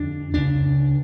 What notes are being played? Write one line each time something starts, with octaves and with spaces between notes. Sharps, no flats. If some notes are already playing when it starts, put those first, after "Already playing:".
Already playing: F2 D3 D4
C#2 C#3 D4